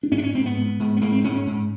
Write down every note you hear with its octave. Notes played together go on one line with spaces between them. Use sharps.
D4
G#2 C#4
D4
C#4
G#2 C4
B3
G#2
G#2
B3
G#2 A#3
C4
G#2 C#4
C#4
G#2